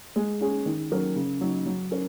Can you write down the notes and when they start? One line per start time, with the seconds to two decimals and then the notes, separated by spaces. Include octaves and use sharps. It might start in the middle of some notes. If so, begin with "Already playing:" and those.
0.16 G#3
0.41 C#4 G#4
0.66 D#3
0.91 F#3 C#4 A#4
1.16 C#3
1.41 F#3 D#4
1.66 F#3
1.91 C#4 A#4